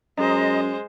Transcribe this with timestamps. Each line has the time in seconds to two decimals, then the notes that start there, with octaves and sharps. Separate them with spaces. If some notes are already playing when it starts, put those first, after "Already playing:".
0.18 F#2 G#3 C5 D#5 A#5